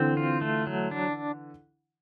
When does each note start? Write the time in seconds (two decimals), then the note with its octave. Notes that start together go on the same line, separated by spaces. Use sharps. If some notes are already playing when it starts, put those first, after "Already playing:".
Already playing: D3 E3 C4
0.17 F4
0.41 A3
0.67 F#3
0.91 D4